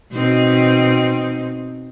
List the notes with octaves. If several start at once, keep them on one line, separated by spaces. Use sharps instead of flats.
B2 C4 D#4